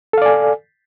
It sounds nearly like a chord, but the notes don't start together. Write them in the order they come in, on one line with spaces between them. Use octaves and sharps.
A4 F5 D5 G#5